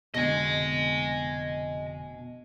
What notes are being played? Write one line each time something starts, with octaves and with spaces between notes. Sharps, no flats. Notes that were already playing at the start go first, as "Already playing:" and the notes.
F1 B2 D3 D#5 G#5